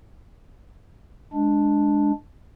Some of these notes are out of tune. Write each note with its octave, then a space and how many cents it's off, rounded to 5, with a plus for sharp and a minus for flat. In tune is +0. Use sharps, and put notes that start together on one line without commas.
G#3 +0 D4 +0